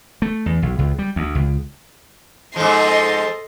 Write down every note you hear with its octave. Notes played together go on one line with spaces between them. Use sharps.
A3
E2
B1
C#2
G3
D2
C#2
G#2 F3 A4 D#5 C6